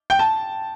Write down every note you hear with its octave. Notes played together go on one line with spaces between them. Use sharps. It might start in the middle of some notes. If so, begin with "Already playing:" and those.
G5
A5